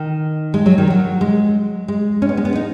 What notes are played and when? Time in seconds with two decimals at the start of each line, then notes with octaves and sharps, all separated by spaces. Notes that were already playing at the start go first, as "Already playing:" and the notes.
Already playing: D#3
0.54 G#3
0.66 F#3
0.78 D#3
0.90 F#3
1.21 G#3
1.88 G#3
2.22 C#4
2.29 B3
2.37 G#3
2.45 B3
2.55 D#4